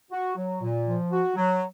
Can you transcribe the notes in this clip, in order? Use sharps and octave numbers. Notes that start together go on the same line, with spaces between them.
F#4
F#3
A#2
F3
F#4
F#3